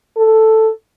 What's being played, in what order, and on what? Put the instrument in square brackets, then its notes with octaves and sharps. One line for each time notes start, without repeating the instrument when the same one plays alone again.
[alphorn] A4